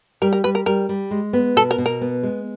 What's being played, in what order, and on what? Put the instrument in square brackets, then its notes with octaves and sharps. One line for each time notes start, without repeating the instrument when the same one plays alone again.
[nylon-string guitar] G3 [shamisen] A#4
[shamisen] A#4
[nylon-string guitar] G3 [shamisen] B4
[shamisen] A#4
[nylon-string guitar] G3 [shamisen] A#4
[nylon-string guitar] G3
G#3
B3
[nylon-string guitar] B2 [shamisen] A4
[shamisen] A#4
[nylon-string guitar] B2
[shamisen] A#4
[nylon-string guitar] B3
G#3